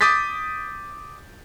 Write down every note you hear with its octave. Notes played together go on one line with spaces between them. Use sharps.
D6 D#6 G6 A6 B6